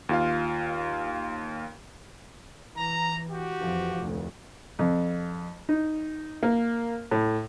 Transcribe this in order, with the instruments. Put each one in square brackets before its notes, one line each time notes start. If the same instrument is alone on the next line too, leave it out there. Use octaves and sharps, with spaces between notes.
[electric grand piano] D#2 F4 F5
[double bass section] E3 [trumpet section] A#5
[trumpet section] F#4 G4
[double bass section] F2 E3 F3
F1 D2
[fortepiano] F2
D#4
A#3
A2